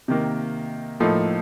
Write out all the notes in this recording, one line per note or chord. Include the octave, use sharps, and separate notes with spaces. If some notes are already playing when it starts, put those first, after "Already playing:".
C3 D#3 A#3
A2 F3 A#3 D#4 A4